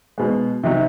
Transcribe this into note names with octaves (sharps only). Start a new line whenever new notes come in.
B2 G#3
C3 F#3 D#4